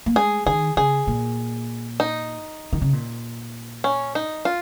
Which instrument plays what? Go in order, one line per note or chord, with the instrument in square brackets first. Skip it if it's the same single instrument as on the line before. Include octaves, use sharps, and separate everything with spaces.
[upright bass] A#3
[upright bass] G#3 [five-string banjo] G#4
[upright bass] D#3 [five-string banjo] G#4
[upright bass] C#3 [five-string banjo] G#4
[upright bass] A#2
[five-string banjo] D#4
[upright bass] D#3
C#3
A#2
[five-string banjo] C#4
D#4
F4